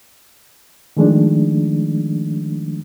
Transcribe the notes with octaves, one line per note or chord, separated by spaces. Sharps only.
D#3 F3 G#3 A3 D4